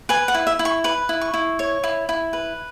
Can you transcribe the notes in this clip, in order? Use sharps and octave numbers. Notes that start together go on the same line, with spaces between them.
B4 G#5
F#5
E4
E5
E4
C#6
B4 B5
E4
C#6
E4
C#5
E4
E4
B4